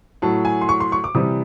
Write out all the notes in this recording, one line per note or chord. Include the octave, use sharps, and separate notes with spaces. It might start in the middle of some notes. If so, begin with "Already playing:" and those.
A2 F#3 A5
G#5
C6
C#6
C6
C#6
D6
C3 E3 G3 D#6